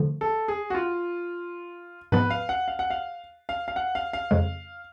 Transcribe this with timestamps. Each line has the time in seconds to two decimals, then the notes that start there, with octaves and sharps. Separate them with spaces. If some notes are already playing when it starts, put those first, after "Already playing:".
Already playing: D3 F3 A3
0.21 A4
0.48 G#4
0.70 F#4
0.75 F4
2.12 G#2 F3 B3 B4
2.30 F5
2.49 F#5
2.68 F5
2.79 F#5
2.90 F5
3.49 F5
3.68 F5
3.76 F#5
3.95 F5
4.13 F5
4.31 F2 C#3 G#3